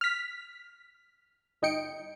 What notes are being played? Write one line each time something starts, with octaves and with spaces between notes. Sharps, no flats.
F6 B6
G1 D#4 D#5 G5 C#7 D7